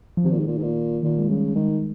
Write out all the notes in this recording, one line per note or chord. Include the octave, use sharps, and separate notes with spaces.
F3
C3 D#3
A#2
G#2
A#2
G#2
A#2
A#2 D#3
G#3
C#3 G3
D#3 G#3